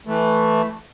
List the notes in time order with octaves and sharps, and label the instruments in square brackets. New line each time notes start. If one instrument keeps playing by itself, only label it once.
[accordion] E3 A3